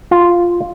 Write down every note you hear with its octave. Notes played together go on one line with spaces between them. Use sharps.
F4